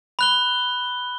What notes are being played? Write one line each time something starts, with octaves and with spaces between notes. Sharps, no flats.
B5 F#6 G7